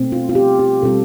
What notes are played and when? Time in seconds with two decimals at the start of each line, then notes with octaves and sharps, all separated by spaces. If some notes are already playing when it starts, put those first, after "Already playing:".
Already playing: B2 A3 C4
0.12 F4
0.29 F4
0.35 G4
0.59 G4
0.82 B2 G3 C4 F4 A4